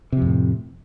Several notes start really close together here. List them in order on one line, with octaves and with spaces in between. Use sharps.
C3 F3 F2 A2